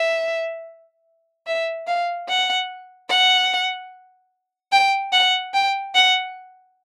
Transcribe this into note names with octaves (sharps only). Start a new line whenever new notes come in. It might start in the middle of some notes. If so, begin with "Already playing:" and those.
Already playing: E5
E5
F5
F#5
F#5
G5
F#5
G5
F#5